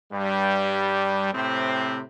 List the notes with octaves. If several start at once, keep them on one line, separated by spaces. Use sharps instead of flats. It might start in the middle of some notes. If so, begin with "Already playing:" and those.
G2 G3
A2 C3 C4